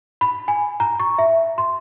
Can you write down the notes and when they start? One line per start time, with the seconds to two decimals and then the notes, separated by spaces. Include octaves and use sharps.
0.21 B5
0.48 G#5
0.80 A#5
1.00 C#6
1.18 E5
1.58 C6